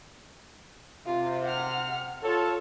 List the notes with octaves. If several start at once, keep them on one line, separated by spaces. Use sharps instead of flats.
C3 F4
F#5 F6
F4 A4 C#5